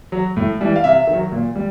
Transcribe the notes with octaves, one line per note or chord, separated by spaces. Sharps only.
F#3
A2
E3 G3
F5
C3 E5
D#3
F#3
A#2
G3